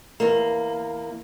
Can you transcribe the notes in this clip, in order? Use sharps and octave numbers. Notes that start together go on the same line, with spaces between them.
E2 A#3